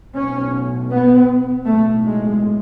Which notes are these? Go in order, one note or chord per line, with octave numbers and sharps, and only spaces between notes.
B1 A2 C#4
B3
B1 A2 A3
G#3